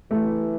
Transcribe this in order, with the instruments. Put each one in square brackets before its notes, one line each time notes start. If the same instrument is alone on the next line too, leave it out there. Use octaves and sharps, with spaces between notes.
[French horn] E3 [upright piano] A3